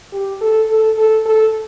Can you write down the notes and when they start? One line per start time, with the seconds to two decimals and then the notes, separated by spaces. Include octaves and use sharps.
0.12 G4
0.41 A4
0.69 A4
0.97 A4
1.26 A4